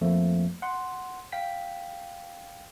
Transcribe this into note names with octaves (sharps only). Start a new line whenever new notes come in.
F2 F3 A3 A#3
F#5 C6
F5 G5 B6